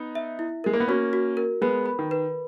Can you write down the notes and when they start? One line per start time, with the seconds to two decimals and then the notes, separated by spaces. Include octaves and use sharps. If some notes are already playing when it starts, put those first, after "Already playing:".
Already playing: B3 D#4
0.15 E5
0.39 E4
0.64 G#3 A#4
0.73 A#3
0.80 B3
0.88 A#3 C#4 F#4
1.13 F#4
1.37 A#4
1.62 G#3 B3 B4
1.86 B5
1.99 D#3
2.11 B4